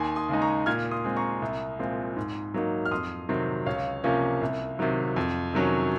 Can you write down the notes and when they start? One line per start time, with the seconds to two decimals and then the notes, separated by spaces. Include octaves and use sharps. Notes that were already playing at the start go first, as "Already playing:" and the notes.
Already playing: D#2 G#5 C6
0.16 C6 D#6
0.29 C#3 G#3 D#4
0.42 A#5 C#6
0.66 A#2 F6 G#6
0.91 C6 D#6
1.04 G#3 C4
1.17 A#5 C#6
1.42 C2
1.79 A#2 F3 G#3 C4
2.17 G#2
2.54 F#3 A#3 D#4
2.85 F6
2.91 F2 C6 D#6
3.29 C3 D#3 F#3 C4
3.66 C#2 C#5 F5
4.04 C3 F3 A#3 C#4
4.41 C2
4.79 C3 D#3 F#3
5.16 F2
5.54 C3 D#3 F#3 C#4